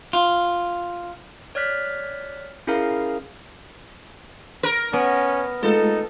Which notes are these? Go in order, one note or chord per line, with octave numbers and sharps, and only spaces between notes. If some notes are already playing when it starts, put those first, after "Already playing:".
F4
C#5 D5 F6 F#6 B6
C#4 E4 G#4 A#4 F5 A#5
A#4
B3 C#4
G#3 A3 D#4 F4 A4